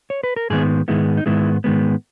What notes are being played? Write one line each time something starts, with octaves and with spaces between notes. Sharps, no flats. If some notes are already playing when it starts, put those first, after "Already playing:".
C#5
B4
A#4
G#2 D#3 G#3 B3 G#4
G#2 D#3 G#3 B3 E4
D#4
G#2 D#3 G#3 B3 E4
G#2 D#3 G#3 B3